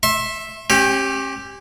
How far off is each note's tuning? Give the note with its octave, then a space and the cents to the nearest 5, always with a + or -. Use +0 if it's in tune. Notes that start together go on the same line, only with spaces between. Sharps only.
E5 +0 C6 +40
C#4 -40 G4 +0